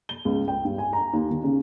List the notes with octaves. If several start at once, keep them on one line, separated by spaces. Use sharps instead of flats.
G7
C#2
G5
G2
G#5
A#5
D#2
D#3
C#3